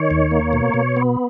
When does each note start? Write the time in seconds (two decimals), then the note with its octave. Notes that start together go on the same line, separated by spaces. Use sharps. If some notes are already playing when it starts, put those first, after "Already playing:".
Already playing: D#3 C#5
0.11 D#2
0.31 A#3
0.53 B2
0.74 B2
0.97 B3